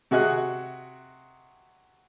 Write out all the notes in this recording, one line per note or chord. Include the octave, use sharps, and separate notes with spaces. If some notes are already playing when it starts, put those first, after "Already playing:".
C3 F#4 G#4 D#5 F#6